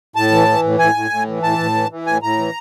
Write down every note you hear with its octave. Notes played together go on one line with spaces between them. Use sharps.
A2 A5
E3
E3
A2
A2 G#5
A2
A2
E3
A2 A5
A2
E3
E3
A2 G#5
A2 A#5
E3